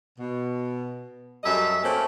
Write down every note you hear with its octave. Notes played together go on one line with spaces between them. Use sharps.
B2
F#2 G3 A4 D#5 E5
A3 A#3 C4 C#4